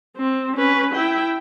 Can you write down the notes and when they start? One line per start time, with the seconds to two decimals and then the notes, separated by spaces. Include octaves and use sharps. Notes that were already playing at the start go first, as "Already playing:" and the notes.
0.17 C4
0.56 C#4 B4
0.94 E4 G5